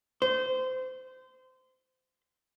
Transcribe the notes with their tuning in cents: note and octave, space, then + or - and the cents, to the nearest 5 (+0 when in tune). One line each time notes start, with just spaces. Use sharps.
C5 -25